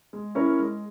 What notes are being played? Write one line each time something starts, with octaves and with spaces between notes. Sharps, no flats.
G#3
C#4 E4 A#4 C#5
G#3